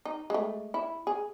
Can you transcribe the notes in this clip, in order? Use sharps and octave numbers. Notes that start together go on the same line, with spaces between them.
D#4
G#3 A3
E4
G#4